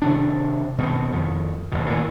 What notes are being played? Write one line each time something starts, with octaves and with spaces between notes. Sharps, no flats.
C3 D#3 D4
B2 D#3 C4
F2 D#3
A1 D#2 B2
A#2 D#3 E3